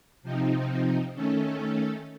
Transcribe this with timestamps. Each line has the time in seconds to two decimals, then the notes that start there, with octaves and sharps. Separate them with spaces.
0.23 C3 F3 C4 D#4
1.14 D#3 A3 C#4 A4